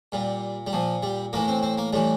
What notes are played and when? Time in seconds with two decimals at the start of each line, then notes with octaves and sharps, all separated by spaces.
0.12 A#2 G3
0.67 G3
0.73 A#2 F3
1.03 G3
1.33 A2 E3 A#3
1.48 C4
1.63 C4
1.78 A#3
1.93 A2 E3 G3